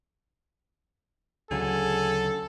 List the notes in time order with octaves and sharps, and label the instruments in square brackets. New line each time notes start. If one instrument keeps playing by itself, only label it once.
[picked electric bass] D2 C#3 F#3 [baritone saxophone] G#4 [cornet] A4